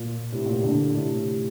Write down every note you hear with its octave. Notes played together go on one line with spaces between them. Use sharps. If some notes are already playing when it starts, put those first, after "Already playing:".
Already playing: A#2
A2 C3
A#2
C3
A#2 D3
A2 C3